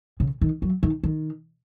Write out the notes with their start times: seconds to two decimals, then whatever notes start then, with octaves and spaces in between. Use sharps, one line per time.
0.20 C#3
0.41 D#3
0.62 F#3
0.83 D#3
1.03 D#3